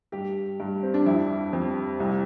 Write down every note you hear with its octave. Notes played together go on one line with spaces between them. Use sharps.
G2 G4
G2
C4
D4
F2 E4
F2
C2